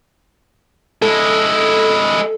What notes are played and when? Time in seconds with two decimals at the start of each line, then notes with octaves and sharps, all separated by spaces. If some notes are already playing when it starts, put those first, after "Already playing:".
1.02 G#3 E4 A4